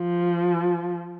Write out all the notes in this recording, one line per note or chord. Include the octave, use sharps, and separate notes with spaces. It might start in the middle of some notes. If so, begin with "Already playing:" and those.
Already playing: F3